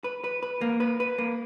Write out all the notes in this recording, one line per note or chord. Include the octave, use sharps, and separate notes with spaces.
B4
B4
B4
A#3
B4
B4
A#3